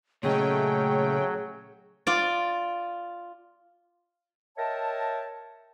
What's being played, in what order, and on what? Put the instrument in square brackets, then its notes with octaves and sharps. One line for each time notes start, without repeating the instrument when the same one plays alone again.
[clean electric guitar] A#2 C#3 D#5 [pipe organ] F#3 [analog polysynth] A3 C#4 G5 [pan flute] G#4
[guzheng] F4 D5
[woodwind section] A#4 C#5 D#5 E5 G5 A5